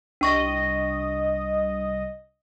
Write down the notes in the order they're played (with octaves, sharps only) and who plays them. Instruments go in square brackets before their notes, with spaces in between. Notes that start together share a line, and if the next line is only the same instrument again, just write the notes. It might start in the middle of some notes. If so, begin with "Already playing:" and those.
[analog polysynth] C2 D#5 [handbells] D4 C#6 A#6